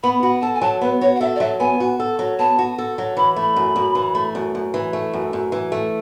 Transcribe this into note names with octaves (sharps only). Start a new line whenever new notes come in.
B3 B5
F#4 B5
A4 A5
G#5
F#3 A5
B3 B4
F#4 C#5
F#5
A4 E5
D5
F#3 E5
B3 G#5
F#4
A4
F#3
B3 A5
F#4
A4
F#3
E3 B5
A3 B5
F#2
F#2
E3
A3
F#2
F#2
E3
A3
F#2
F#2
E3
A3